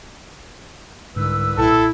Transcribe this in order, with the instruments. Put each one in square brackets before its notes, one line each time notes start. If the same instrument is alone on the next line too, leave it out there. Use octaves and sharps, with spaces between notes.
[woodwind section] C2 B4 E6 [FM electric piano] G#2 D3
[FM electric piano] B1 A#2 G5 [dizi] E4 [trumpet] A4